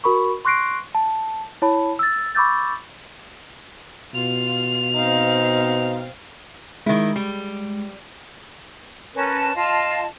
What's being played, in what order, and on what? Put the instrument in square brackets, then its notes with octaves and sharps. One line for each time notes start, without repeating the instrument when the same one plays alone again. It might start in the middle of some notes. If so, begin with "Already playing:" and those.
[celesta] F#4 A#4 B5 C#6
C6 C#6 F#6 A#6 C7 D7
A5
E4 C#5 A5 B5
E6 A6
B5 C#6 D6 E6 G6 A6
[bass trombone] B2 [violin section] F4 [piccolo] F7
[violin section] C4 F5 [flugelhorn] D#4
[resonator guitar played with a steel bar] D#3 E4 [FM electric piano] G#3
[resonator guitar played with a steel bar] G3
[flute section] C#4 A#4 B4 A5
F4 D#5 F5 A5